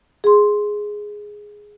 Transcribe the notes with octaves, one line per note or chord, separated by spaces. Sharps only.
G#4 C6